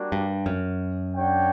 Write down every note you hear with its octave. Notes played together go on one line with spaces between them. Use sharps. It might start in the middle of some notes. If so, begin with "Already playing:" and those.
Already playing: G3 A#3 D4 F#4
G2
F#2
D4 F#4 C#5 G5